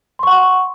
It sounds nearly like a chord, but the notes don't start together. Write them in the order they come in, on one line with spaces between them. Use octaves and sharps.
C6 C#6 F#5